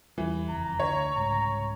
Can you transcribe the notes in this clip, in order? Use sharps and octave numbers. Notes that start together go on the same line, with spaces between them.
E2 E3 G3
F#1 F2 A#5
D2 D3 C#5
C2 G#2 C#3 A#5